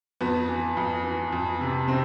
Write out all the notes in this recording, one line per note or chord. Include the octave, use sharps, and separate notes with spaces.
F2 B3
E3
F2
E3
F2
C3
C3 C4